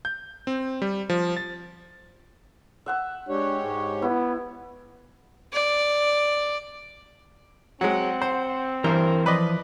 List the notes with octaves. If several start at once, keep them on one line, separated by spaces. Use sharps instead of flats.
G6
C4
G3
F3
A6
E5 F#5 E6
G#3 D4 G4 C#5
G#2
B3 E4
D5
F#3 G#3 C4 F#5
C5
G2 E3 A#4 C5 A#5
F3 B4 D5 D#5